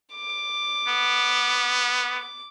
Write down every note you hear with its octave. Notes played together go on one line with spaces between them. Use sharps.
D6
B3